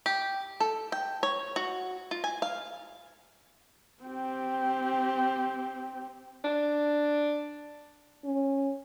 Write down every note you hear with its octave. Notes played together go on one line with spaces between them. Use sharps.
G4
A4
G5
C#5
F#4
F4
G#5
F5
C4 G4
D4
C#4